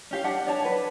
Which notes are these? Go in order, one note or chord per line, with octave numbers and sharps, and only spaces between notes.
C#4 G4 F5
D4 F#5 A5
D4 C#5 A5
B4